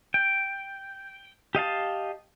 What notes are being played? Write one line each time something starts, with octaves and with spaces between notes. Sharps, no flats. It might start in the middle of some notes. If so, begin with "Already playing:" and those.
G5
G4 D#5 F5 A5